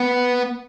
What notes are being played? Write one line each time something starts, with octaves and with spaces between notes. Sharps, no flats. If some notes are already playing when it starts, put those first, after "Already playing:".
Already playing: B3